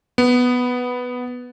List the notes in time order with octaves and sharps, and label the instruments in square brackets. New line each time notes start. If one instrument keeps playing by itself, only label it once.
[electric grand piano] B3